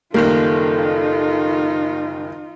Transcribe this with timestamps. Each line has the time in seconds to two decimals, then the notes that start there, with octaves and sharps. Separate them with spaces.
0.14 F#1 D#3 G3 A#3 D#4 F4 A4